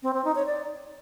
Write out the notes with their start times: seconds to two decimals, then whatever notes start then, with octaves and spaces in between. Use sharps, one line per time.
0.03 C4
0.14 C4
0.25 D#4
0.35 C#5
0.46 D5